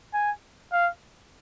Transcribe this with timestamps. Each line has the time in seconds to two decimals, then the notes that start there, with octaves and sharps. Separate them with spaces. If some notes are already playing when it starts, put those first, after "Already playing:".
0.14 G#5
0.72 F5